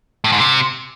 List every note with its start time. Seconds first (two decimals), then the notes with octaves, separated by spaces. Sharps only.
0.24 A2
0.32 G#2
0.40 C3